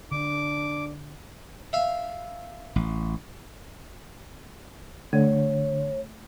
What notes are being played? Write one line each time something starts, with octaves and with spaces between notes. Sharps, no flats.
D3 D4 D6
E5 F5
A1
D3 A3 C#5